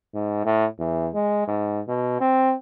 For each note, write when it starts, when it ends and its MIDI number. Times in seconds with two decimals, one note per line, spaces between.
0.14 0.40 44
0.45 0.65 45
0.79 1.09 40
1.14 1.46 56
1.47 1.80 44
1.88 2.19 47
2.20 2.53 60